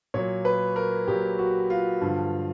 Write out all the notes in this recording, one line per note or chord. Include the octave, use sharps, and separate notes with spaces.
A#2 F#3 C#5
B4
A#4
A#2 F#3 G4
F#4
F4
G2 D3 F3